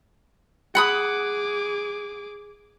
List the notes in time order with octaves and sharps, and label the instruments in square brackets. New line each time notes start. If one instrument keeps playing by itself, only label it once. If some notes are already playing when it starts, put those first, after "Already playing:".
[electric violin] G#4 D6 [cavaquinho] F#5 B5 D#6